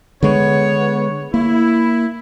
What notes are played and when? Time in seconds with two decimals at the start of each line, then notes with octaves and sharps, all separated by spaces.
0.23 D3 G#3 B3 C#5
1.34 A#3 E4